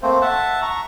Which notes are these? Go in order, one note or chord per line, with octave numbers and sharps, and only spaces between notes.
A3 A#3 C4 C5
E5 F#5 A5
A#5 C#6